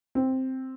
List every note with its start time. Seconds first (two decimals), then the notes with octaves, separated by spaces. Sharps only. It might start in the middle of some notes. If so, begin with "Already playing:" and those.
0.15 C4